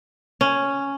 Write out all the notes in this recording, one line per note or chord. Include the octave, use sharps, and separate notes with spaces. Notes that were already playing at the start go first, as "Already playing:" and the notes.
C#4